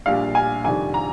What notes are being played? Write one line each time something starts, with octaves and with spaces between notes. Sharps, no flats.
A#1 A#2 G3 D4 F5
G#5
F2 C3 D#3 G3 D4 G#5
A#5